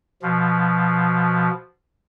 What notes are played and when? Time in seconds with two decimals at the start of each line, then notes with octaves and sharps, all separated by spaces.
0.22 B2 F3